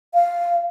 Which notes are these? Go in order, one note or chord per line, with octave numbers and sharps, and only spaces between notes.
F5